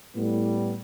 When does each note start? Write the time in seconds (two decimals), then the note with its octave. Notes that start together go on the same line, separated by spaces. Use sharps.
0.14 A2 G3 B3